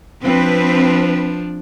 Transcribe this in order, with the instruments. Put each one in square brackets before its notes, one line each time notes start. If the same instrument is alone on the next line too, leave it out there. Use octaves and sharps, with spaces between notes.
[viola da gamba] F3 D4 [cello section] C4 B4